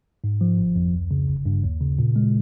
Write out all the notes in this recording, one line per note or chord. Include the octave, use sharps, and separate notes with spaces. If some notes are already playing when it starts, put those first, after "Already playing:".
G#2
F3
G1
F2
C#2
C#3
G1
G2
D#2
C#3
A#2
G#3